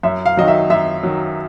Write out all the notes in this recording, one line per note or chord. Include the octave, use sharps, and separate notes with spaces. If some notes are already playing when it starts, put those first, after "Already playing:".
F#2 E5
F5
D#3 F#3 D#5
E5
F#2 E5
D#3 F#3